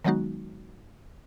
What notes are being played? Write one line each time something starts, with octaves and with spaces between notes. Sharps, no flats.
D#3 F#3 G#3 B3 D#4 F#4